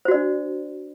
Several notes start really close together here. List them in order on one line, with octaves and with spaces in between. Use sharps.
C5 F#4 D5 D4